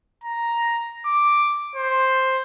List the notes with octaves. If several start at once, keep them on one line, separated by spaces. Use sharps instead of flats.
A#5
D6
C5